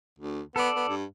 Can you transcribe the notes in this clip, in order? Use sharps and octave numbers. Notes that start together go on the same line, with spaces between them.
D2
B3 A4 D5
B3
G2